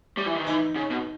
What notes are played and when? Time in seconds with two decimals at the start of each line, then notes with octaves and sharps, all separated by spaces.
0.17 G3
0.26 E3
0.36 D#3
0.45 E3 D#4
0.76 C#3
0.90 B2